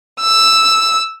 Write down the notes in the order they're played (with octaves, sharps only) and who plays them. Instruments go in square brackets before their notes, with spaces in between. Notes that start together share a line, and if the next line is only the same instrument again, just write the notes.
[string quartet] E6